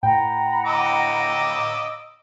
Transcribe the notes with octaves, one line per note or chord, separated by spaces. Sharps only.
A2 F#5 G5 A#5 B5
D#5 D6 E6